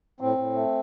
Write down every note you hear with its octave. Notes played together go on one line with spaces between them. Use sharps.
A2 C4
A2
A3